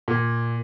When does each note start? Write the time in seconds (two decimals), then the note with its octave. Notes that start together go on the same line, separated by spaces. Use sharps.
0.08 A#2